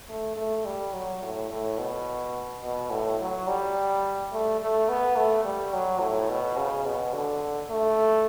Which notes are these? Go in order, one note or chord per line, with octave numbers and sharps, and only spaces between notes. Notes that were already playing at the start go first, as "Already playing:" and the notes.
A3
A3
G3
F#3
A2
A2
B2
B2
A2
F#3
G3
A3
A3
B3
A3
G3
F#3
A2
B2
C#3
B2
D3
A3